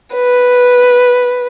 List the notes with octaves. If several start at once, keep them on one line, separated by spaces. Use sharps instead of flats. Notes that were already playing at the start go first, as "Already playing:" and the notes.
B4